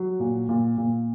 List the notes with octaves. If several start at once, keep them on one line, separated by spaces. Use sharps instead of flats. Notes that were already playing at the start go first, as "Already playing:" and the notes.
Already playing: F#3
A#2
A#2
A#2